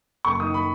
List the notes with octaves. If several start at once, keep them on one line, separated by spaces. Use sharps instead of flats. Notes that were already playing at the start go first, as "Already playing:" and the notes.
F#1 C#6
D#3 D#6
B5